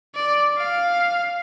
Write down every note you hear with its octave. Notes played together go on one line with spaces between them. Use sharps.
D5
F5